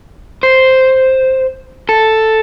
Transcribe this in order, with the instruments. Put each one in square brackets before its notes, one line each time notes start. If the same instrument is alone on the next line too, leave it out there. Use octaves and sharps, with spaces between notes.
[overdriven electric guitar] C5
A4